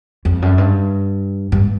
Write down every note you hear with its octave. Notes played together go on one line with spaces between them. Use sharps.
F2
F#2
G2
G2